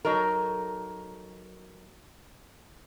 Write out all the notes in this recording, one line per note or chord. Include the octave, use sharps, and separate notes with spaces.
F#3 D#4 A4 A#4